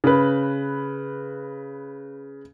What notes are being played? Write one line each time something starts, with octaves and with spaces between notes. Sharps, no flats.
C#3 B4